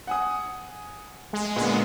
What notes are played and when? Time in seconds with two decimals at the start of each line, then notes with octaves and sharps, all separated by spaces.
0.07 F#5 G#5 D#6
1.33 G#3
1.56 A#2 D3 G#3 B3